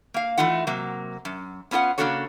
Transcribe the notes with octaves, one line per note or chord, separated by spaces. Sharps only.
A#3 F5
E3 A3 D#4 F4 F#5
C3 F#3 A#3
F#2
B3 C#4 F4 A#4 F#5
C#3 A#3 D4 F#4 A4 C#5